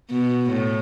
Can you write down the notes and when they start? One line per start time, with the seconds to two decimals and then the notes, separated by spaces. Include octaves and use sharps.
0.10 B2
0.50 A2